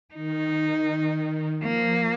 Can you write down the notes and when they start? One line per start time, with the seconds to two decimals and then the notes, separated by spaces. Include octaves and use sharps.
0.15 D#3 D#4
1.61 F3 A#3